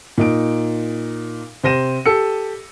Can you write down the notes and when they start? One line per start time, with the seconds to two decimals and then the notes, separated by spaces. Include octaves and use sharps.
0.18 A#2 D#4 D7
1.64 C3 C5 A#6 D#7 E7
2.06 G4 A4 E6 C#7